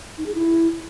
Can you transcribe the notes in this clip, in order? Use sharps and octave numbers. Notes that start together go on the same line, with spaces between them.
D#4
G#4
E4